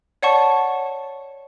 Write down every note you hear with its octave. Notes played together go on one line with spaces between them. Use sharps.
C#5 D5 F#5 A5 C#6